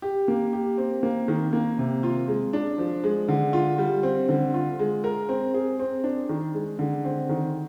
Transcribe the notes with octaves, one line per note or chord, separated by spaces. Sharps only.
G4
A#3
G4
C4
A#3
D#3
A#3
C3
F4
G#3
D4
F3
G#3
D3
F4
G3
C4
D3
F4
G#3
A#4
C4
G#4
C4
D4
D#3
G#3
D3
C4
D#3